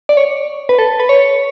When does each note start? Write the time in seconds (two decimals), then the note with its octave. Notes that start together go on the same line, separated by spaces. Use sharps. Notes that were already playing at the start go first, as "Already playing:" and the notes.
0.09 D5
0.17 C#5
0.69 B4
0.79 A4
1.00 B4
1.09 C#5